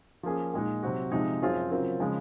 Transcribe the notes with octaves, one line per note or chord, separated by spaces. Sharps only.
F3 A#3 C#4 G#4
A#2 G#3 D#4
C3 F#3 C4 F#4
C3 F3 G#3 D#4
F#2 F3 C4 F4 G#4
C#3 F#3 C4 F4 A#4
C#3 F3 G#3